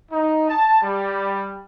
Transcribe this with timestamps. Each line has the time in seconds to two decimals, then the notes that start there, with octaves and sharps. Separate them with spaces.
0.10 D#4
0.49 A5
0.81 G3